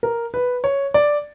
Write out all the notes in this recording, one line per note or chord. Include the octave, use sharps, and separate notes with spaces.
A#4
B4
C#5
D5